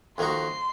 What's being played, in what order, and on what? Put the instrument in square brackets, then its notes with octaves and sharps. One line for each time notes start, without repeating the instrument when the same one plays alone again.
[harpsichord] F2 D#3 A#3 D#4 F#4 [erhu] C6